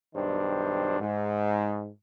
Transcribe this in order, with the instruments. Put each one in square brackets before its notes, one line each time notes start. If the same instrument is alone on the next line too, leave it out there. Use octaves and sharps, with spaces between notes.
[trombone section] B1 G2 D#3 D4 C5
G#2